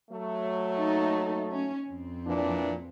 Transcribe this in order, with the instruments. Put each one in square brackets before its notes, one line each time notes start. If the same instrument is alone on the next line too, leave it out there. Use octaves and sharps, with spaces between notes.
[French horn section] F#3 A3
[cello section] A#3 D#4 A4
C#4
F2 C4
[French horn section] A#2 E3 D4